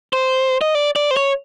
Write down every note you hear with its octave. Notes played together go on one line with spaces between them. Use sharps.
C5
D#5
D5
D5
C5
C#5